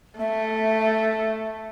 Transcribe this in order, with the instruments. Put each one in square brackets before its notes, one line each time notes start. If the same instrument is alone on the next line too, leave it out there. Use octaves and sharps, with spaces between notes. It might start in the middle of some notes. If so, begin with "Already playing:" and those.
[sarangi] A3 [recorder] E5